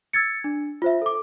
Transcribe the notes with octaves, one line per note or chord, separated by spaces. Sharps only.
E6 G#6 A6 C#7
D4
F4 C5 E5
A4 D6